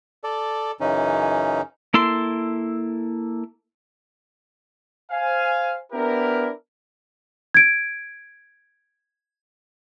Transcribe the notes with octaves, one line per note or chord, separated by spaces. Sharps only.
A4 D5
F#2 C#3 E3 C#4 D#4
A#3 E4 A4 C6
C5 F5 G#5
B3 D4 E4 G4 A#4
G#6 D7